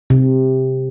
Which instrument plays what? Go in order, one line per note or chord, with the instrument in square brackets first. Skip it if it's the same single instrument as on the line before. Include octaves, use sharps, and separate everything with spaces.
[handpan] C3